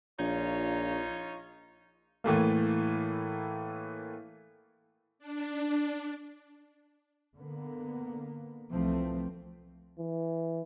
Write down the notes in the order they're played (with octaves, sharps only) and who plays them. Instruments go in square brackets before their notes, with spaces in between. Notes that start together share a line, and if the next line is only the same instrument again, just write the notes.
[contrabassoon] A#1 [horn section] D#4 F4 C#5
[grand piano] A2 E3 A3 A#3
[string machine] D4
[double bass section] D3 A#3 B3
C2 E3 F3 A3 C4
[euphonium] E3